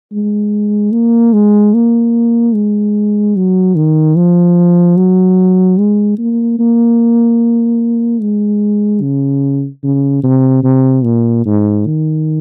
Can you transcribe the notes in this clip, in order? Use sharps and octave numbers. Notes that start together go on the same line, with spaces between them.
G#3
A#3
G#3
A#3
G#3
F#3
D#3
F3
F#3
G#3
A#3
A#3
G#3
C#3
C#3
C3
C3
A#2
G#2
D#3